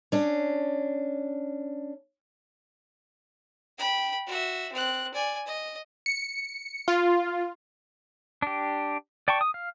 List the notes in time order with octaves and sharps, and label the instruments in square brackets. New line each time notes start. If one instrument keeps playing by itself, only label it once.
[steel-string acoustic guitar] C#4 D4
[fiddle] G5 B5
F#4 E5
C4 F#6
D5 G#5
D#5
[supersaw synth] C#7
F4
[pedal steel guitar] D4 G4
D5 G5 A5 C#6
D#6
F5